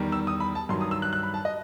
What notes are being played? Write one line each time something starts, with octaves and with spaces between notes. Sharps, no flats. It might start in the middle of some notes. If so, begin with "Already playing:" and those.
Already playing: E2 D#3 G3
E6
D#6
B5
A5
G2 D#3 F#3 C6
D#6
E6
F#6
F#6
B5
A5
D#5